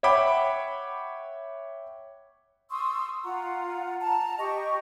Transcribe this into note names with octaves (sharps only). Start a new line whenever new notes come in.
C#5 E5 F#5 G5 B5 D6
C6 C#6 D#6 E6
F4 F#5 A#5
A5 A#5
G4 D#5 C#6